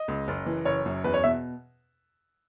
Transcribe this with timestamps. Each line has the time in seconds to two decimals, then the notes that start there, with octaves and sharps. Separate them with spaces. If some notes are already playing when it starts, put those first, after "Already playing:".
Already playing: D#5
0.08 C#2
0.28 F#1
0.46 E3
0.65 F#1 C#5
0.86 F#2
1.04 E2 B4
1.14 C#5
1.24 B2 E5